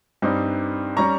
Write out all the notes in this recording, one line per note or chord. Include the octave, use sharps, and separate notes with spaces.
G2 G3 C4 D#4
G3 C#4 A#5 C#6